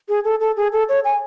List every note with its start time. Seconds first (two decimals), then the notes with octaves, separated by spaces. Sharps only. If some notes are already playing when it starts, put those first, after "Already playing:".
0.09 G#4
0.24 A4
0.40 A4
0.57 G#4
0.72 A4
0.89 C#5
1.04 G#5